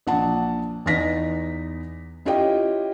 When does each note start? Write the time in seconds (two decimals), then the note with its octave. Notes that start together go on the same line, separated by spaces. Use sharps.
0.07 A#1 F#5 A5
0.86 E2 B3 D#4 A#6 B6
2.25 C#4 E4 F4 G4 D#5 G5